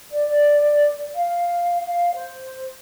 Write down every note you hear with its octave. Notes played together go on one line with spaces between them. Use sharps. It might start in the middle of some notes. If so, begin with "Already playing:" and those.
D5
F5
F5
C5